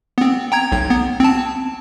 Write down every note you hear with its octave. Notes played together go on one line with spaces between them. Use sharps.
B3 C4
G5 A#5 G#6
B1 G#6
B3
C4 A5